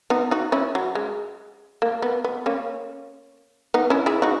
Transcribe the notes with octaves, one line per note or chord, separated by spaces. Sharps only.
B3 D#4
D#4 F#4
C#4 E4
F#3
G#3
A#3
B3
B3
A#3 C#4
B3 D#4
C#4 E4
E4 G#4
D#4 F#4